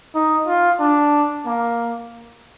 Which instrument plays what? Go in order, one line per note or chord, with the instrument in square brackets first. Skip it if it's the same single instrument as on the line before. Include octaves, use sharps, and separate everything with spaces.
[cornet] D#4
F4
D4
A#3